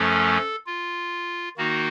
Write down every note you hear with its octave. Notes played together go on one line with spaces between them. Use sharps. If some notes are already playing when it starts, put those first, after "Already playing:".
Already playing: F#2 F3 A3 C#4 A4
F4
D#3 A#3 D#4 F#4